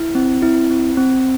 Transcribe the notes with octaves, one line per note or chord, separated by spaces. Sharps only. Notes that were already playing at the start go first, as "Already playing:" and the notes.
Already playing: E4
C4
E4
C4
C4